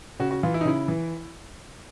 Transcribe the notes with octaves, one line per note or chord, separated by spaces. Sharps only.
C#3 F#4
F#4
E3 F4
E4
D#4
C#3 E4
E3